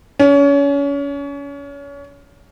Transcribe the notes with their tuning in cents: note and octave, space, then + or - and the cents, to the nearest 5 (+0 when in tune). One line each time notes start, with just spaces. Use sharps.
C#4 +30